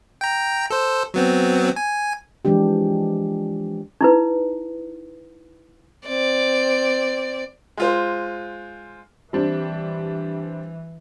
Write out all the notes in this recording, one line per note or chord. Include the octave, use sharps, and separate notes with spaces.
G5 A#5
A4 C5
F#3 B3 C4
G#5
E3 F3 G#3 D4 G4
D#4 E4 B4
C4 D5
G#3 F4 C5
E3 G3 C4 D4